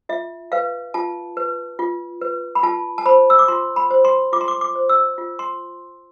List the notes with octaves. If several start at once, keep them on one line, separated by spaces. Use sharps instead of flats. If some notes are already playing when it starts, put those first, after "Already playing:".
F4 E5
B4 F5
F4 A5
B4
F4
B4
B5
F4 A5
A5
C5 B5
E6
D6
F4 C6
B5
C5
C6
F4 D6
C6
D6
D6
C5
E6
F4
C6